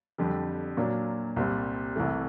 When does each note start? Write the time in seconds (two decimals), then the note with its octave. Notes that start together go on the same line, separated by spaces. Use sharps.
0.18 F2 D3 G3
0.77 A#2 F#3 A#3 D4
1.36 C2 A#2 G3 C4
1.96 C2 C3 E3 A3